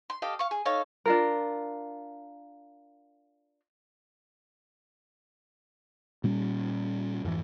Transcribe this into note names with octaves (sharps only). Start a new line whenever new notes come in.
C6
G4 A4 D#5 F5
F5 C#6
G#4
D#4 A4 C#5 F5
D4 F4 A#4
A#2 G3 C#4
F2 G#2 E3